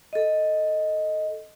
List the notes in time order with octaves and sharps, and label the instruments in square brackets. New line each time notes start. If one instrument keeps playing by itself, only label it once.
[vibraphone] A4 D#5